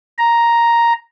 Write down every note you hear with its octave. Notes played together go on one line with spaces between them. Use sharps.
A#5